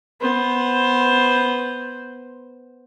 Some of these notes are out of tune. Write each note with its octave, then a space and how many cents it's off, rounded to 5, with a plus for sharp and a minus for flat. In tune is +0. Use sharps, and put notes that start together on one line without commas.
B3 +0 C5 +5